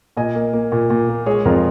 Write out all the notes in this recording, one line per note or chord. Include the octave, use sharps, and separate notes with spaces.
A#2 D#5 G#5
A#3
A#3
A#2
A#2
A#3
G#3 G#4 C#5
F2 F4 A#4